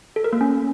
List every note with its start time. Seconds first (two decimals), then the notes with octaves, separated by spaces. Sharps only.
0.16 A4
0.24 A#4
0.33 A#3
0.41 C#4